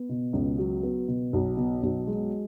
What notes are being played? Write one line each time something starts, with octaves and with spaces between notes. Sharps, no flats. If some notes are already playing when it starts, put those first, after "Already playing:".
Already playing: B3
B2
C#2
F#3
B3
B2
B1
B2
B1
G#3